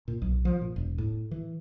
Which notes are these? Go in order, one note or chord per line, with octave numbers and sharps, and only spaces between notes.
A#2
B1
F3
A#2
E1
A2
E3